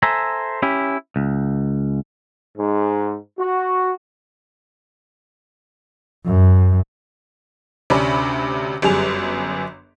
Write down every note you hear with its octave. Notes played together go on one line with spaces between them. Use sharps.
A4 C5 E5 G#5 A#5
C#4 E4 G4
C#2
G#2
F#4
F#2
D2 C3 C#4 D4 B5
G1 F#2 G3 G#4 F7